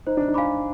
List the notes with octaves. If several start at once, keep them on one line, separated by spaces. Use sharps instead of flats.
D#4 C5
D4
D#4
F5 G#5 B5 D6